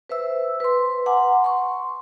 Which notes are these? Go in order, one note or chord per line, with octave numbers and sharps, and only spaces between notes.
B4 C5 E5 E6
B4 C6
F#5 G#5 A#5 C6 D6
C6 C#6